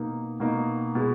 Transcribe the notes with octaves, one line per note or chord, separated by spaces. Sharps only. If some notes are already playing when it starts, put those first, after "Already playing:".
Already playing: B2 A#3 D#4
B2 A#3 D#4
B2 G#3